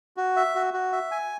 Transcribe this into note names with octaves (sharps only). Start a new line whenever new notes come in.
F#4
E5
F#4
F#4
E5
G#5